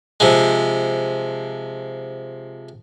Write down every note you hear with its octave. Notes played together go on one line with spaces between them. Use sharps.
C3 F3 G#3